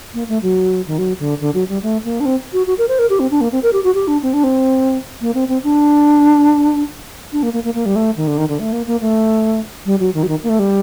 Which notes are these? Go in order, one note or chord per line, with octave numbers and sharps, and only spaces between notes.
A#3
A3
F#3
D#3
F#3
D3
D3
F#3
G3
A3
A#3
D4
C4
F#4
F#4
A#4
C5
A#4
G4
C4
D4
A#3
C4
A#4
G4
F#4
G4
D4
C4
D4
C4
A#3
C4
C4
D4
D4
A#3
A#3
A#3
A#3
G3
A3
D#3
D3
D#3
D3
A3
A#3
A#3
A3
G3
F#3
D#3
F#3
D#3
A#3
A3
G3